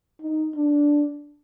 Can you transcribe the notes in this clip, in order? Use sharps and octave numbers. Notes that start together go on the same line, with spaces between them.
D#4
D4